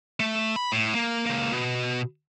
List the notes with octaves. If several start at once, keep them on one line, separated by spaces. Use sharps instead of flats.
A3
B5
A2
A#3
C#2 A#3
B2